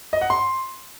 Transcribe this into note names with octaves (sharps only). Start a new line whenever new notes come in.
D#5
F#5
C6